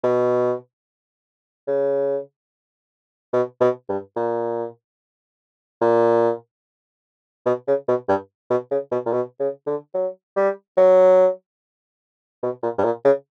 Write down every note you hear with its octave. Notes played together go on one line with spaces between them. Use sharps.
B2
C#3
B2
B2
G2
A#2
A#2
B2
C#3
B2
G2
B2
C#3
B2
A#2
B2
C#3
D3
F#3
G3
F#3
B2
A#2
G2
A#2
C#3